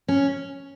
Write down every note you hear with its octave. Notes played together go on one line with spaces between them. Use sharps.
C#4